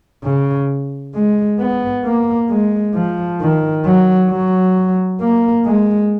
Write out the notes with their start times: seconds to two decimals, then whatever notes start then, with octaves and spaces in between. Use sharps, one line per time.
0.24 C#3
1.15 G#3
1.59 B3
2.04 A#3
2.50 G#3
2.95 F3
3.41 D#3
3.85 F#3
4.30 F#3
5.21 A#3
5.65 G#3